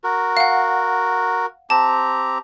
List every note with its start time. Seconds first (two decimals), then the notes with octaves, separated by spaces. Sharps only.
0.04 F#4 A#4
0.37 F5 F#5
1.70 C4 G4 A5 A#5